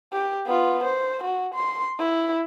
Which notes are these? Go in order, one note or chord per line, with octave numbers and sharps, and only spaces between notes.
G4
B3 F4
C5
F#4
C6
E4